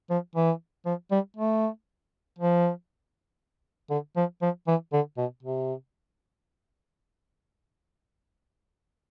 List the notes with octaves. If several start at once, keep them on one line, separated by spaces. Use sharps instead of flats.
F3
E3
F3
G3
A3
F3
D3
F3
F3
E3
D3
B2
C3